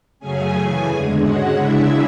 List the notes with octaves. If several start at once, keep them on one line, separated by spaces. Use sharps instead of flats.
F#2 C#3 F#3 A3 C#4 G#4 G#5
C#3 E3 A3
E2 D3 G#3
G#2 G#3 C#4 F#4 F#5
C#3 G#3 D4 E4 E5